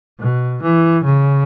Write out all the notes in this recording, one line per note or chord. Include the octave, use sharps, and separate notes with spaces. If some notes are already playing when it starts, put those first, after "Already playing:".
B2
E3
C#3